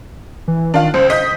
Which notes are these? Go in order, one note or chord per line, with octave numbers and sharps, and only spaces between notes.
E3
D#3 D4 F4
C#2 C5
D#5 D#6 G6 B6